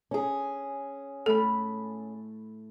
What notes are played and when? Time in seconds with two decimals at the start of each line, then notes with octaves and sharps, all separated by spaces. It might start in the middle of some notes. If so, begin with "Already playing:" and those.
0.11 C#4 G#4
1.26 A2 A3 A4 B5